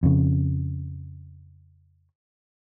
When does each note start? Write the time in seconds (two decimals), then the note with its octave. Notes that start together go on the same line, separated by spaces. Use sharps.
0.03 F2 C#3